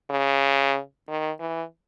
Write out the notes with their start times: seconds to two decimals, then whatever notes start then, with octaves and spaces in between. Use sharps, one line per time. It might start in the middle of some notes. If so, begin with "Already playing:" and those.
0.10 C#3
1.08 D#3
1.40 E3